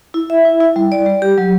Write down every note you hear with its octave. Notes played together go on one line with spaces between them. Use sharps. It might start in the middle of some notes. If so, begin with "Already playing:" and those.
E4
E5
E4
E4
G3
D5
G3
G4
F#3